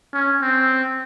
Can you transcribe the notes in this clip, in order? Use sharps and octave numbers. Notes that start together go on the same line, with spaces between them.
C#4
C4